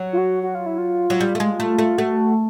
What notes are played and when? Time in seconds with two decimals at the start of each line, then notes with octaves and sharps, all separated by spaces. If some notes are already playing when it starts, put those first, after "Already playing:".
Already playing: F#3
0.13 F4
0.18 F#4
0.43 F#4
0.55 F4
0.66 E4
0.78 F4
1.10 F#3
1.21 G3
1.35 A3
1.40 G#3
1.60 A3
1.79 A3
1.98 A3 F#4